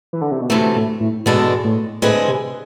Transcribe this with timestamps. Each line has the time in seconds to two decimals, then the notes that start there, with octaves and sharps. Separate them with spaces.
0.13 E3
0.21 D3
0.31 C3
0.41 B2
0.50 D2 A2 C3 E3 A3
0.76 A2
1.00 A2
1.26 E2 G#2 B2 G#3 D4 A4
1.65 A2
2.02 A2 D3 G#3 C4 G#4 B4
2.28 C3